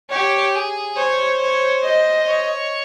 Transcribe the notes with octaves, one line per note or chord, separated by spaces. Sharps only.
G4 C#5
G#4
C5 C#5
C#5
D#5
C#5